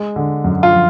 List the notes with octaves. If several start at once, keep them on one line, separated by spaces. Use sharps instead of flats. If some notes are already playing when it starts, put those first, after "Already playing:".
Already playing: G#3
D3
F#2
F4
F3